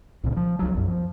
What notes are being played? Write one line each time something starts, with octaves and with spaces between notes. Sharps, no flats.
C2 A#2 C#3
F3
C2 F#3
B1 F#2
F3